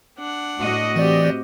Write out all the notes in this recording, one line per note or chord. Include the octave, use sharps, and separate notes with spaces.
D4 F#5
A2 F#4 D#5
E3 C4 G4 D5